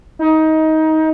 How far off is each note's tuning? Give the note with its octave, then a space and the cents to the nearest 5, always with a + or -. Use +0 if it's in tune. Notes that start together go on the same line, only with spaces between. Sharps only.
D#4 +20